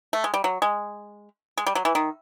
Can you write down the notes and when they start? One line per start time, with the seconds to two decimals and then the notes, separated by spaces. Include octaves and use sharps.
0.13 A3
0.24 G#3
0.34 G3
0.44 F#3
0.62 G#3
1.58 G#3
1.67 G3
1.75 F#3
1.85 E3
1.95 D#3